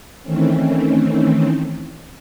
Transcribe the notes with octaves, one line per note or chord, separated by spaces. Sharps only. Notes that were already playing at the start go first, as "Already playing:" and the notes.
D#3 E3 A3 C4 C#4